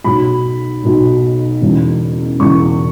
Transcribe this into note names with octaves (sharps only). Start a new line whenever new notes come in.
B1 B2 F#3 B5
B1 B2 F#3
E1 E2 C#3
E1 E2 C#3 C#6